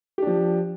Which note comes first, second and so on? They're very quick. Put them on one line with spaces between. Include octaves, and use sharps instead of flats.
G4 D4 F3